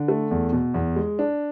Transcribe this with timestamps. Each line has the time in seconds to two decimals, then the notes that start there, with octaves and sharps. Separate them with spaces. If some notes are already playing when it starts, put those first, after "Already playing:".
Already playing: D3
0.08 A3
0.31 E2
0.53 B2
0.74 E2
0.96 G#3
1.19 D4